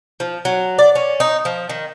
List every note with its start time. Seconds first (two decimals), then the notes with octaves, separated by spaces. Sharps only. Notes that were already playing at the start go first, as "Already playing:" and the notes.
0.20 F3
0.45 F#3
0.78 D5
0.95 C#4
1.20 D#4
1.45 F3
1.69 D#3